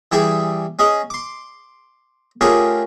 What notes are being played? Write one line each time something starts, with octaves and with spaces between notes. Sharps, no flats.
E3 G3 E4 G4 G#4
C#4 G#4 D#5
C6 D6
A3 C#4 F4 G4 G#4 A#4